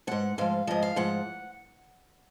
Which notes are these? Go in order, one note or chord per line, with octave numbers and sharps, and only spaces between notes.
G#2 F3 F#5
G#2 F3 F5
G#2 F3 D#5
F5
G#2 F3 F#5